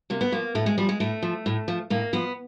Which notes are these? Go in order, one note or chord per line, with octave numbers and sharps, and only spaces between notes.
C3 A#3
B3
F3 A#3
A2 A3
G#3
F3 G3
G#3
A2 A3
F3
A2
F3
A2 A#3
F3 B3